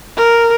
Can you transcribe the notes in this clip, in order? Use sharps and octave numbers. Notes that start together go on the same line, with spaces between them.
A#4